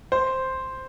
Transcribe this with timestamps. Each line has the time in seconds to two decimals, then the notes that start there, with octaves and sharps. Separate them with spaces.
0.12 C5